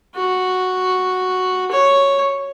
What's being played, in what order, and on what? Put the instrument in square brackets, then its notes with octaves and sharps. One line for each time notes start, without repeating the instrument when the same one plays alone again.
[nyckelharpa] F#4
C#5